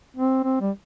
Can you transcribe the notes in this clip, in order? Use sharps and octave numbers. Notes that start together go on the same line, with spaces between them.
C4
C4
G3